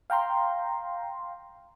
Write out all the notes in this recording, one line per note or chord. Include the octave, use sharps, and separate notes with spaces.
F5 G5 A#5 C6